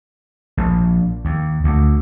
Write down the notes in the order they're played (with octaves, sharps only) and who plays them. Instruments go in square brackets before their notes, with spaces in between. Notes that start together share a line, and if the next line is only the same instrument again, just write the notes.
[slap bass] A#1
D#2
D2